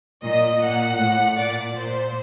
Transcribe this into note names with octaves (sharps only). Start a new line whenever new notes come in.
A#2 D#5
A#2 F#5
A2
A#2 D5
A#2 C5